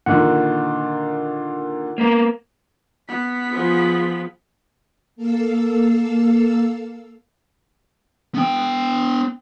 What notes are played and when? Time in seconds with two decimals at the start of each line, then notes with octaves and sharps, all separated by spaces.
0.06 A#2 D3 D#3 F#5
1.98 A#3 B3 A#4
3.08 B3 B6
3.51 F3 G#4
5.16 A#3 A4 F5 E6
8.35 B3 G5